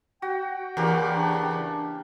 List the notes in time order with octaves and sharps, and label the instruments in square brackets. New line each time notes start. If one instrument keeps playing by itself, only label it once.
[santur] F#4 [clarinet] G5
[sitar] E2 C#3 [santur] A#3 G4
[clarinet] D4